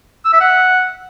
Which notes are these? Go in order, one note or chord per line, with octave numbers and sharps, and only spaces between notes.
E6
E5
F#5